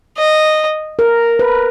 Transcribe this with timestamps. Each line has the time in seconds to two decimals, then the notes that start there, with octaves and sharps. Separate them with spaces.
0.18 D#5
0.99 A#4
1.39 B4